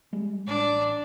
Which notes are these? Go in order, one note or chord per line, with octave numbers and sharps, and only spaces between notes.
G3 G#3
A1 D4